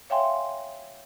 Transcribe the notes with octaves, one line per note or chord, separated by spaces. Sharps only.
C#5 E5 F5 G5 G#5 C6